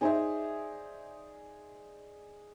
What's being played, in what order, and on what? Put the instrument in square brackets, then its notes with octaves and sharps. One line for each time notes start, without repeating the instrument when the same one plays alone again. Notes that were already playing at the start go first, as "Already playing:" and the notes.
[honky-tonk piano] D#4 C5 E5 [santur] G#4 D5 G#5